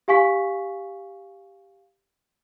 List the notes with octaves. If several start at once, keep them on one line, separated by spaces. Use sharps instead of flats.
G4 F5 G#5 C#6 B6